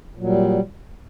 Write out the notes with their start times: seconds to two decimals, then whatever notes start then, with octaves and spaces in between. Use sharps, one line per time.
0.15 A#2
0.20 F#3
0.24 G3